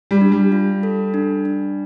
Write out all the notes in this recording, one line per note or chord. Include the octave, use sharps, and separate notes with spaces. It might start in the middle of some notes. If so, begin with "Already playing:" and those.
G3
D4
G3
F4
A4
D4
D4